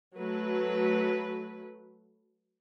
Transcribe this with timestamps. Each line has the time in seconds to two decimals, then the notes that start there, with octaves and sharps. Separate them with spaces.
0.17 F#3 A3 B4